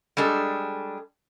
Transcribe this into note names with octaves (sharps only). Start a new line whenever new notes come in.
G3 G#3 D4 A4